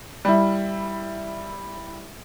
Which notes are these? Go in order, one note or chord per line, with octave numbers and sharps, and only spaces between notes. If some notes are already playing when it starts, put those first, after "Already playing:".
G3 E4